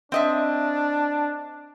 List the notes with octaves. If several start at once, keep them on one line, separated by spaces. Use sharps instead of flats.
C4 D4 D#5 E5